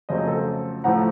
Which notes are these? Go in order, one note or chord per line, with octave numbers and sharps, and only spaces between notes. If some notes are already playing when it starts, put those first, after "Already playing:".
F2 C#3 F#3 A3 C5 D#5
A4 C5
A2 F3 A3 F#5 A#5